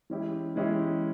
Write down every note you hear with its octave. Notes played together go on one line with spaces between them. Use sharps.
E3 G#3 C#4 E4 G4
E3 G#3 C#4 E4 G4